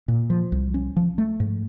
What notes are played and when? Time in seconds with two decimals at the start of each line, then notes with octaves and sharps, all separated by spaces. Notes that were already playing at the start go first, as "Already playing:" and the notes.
0.08 A#2
0.30 F3
0.52 C2
0.74 C#4
0.97 F3
1.18 A3
1.40 G#2